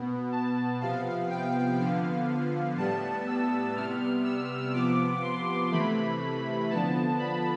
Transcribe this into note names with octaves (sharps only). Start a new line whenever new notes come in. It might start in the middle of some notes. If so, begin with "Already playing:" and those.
Already playing: B2 B3
A5
C3 F3 B3 F5
G5
D3 F3 B3 F5
A2 G3 B3 A5
E6
C3 G3 B3 F6
E6
C3 F3 B3 D6
C6
C3 E3 A3 B5
D3 F3 B3 A5
B5